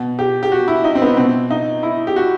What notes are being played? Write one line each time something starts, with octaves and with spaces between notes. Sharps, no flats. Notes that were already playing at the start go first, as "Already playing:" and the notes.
Already playing: B2
G4
G4
F#4
E4
D#4
C4
B3
B2 C4
D#4
E4
G4
F#4